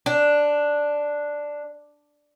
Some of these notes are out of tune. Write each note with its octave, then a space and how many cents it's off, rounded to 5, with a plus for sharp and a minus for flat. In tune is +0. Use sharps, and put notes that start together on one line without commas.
D4 +0